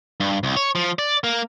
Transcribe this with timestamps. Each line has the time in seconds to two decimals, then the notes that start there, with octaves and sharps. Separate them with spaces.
0.20 G2
0.43 C2
0.57 C#5
0.75 F3
0.99 D5
1.24 A#3